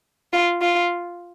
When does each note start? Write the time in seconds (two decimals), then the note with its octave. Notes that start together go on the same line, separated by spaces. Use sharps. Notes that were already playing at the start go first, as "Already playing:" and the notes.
0.33 F4
0.62 F4